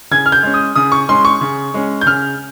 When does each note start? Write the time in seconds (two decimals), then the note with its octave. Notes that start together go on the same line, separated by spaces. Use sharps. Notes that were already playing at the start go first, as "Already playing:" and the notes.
0.11 C#3 G#6
0.26 F6
0.32 G6
0.43 G#3 C#4
0.54 D#6
0.75 C#3 D#6
0.92 C#6
1.09 G#3 C#4 C6
1.25 C#6
1.41 C#3
1.74 G#3 C#4
2.01 G6
2.06 C#3 F6